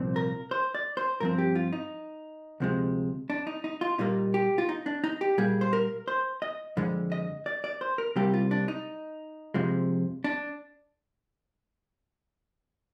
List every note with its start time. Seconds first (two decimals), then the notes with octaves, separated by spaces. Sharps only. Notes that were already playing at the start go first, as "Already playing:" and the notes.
Already playing: C2 A#2 F3 C4
0.16 A#4
0.51 C5
0.75 D5
0.97 C5
1.20 G2 F3 C4 A#4
1.38 G4
1.55 F4
1.73 D#4
2.60 D2 C3 F3 G#3
3.30 D4
3.47 D#4
3.64 D#4
3.81 F4
3.98 A#2 G3 A#3 D#4
4.34 G4
4.58 F4
4.69 D#4
4.86 D4
5.04 D#4
5.21 G4
5.38 A#2 G3 A#3 G#4
5.61 C5
5.73 A#4
6.08 C5
6.42 D#5
6.77 F2 D3 G#3
7.12 D#5
7.46 D5
7.64 D5
7.81 C5
7.98 A#4
8.16 C2 C3 G3 A#3 G4
8.34 F4
8.51 D4
8.68 D#4
9.54 F2 C3 F3 G#3
10.24 D4